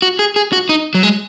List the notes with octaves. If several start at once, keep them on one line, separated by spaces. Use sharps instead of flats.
F#4
G#4
G#4
F#4
D#4
F#3
G#3